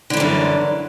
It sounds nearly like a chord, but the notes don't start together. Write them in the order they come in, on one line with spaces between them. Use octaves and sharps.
D3 E3 G3 F#2